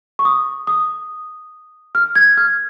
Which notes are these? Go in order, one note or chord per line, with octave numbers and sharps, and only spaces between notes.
C#6
D#6
D#6
F6
G#6
F6